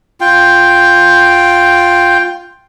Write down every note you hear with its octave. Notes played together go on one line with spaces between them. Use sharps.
F4 G5